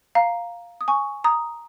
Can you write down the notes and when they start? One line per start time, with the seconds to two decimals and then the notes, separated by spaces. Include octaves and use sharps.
0.15 F5 A#5
0.81 D#6
0.88 G#5 C#6
1.24 A#5 D#6